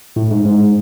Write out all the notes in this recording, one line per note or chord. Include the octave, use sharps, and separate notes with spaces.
A2
G#2
G#2